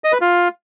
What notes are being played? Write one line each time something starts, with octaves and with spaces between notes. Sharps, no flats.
D#5
B4
F4